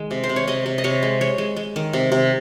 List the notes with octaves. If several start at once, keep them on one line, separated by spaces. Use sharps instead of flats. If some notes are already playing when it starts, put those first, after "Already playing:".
Already playing: D#3 G#3
C3
C5
C3
C#5
C3 D#5
C3
D#5
C3 C#5
G#3
G#3 C#5
G#3
G#3
D#3
C3
C3